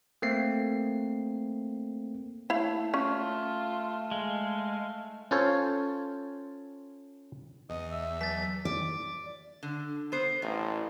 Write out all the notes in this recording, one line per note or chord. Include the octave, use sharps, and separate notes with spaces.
A3 A#3 C4 C7
A3 E4 C#5 F5
C#4 F4
G#3 F5
C#4 F4 A4 C5 C#5
E2 D#5
E5
F#3 A6 B6
D5
D3
B3 C5
A1 A2